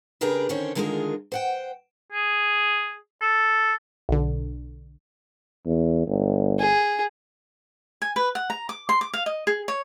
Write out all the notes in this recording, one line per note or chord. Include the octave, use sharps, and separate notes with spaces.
C#3 D4 G4 G#4 A#4 B4
D3 D#3 C4 C#4 C5 C#5
D3 D#3 G#3 F4 G#4 A#4
C5 F#5 G5
G#4
A4
B1 D3
E2
G1
G#4
G#5
B4
F#5
A#5
D6
C6
D6
F5
D#5
G#4
C#5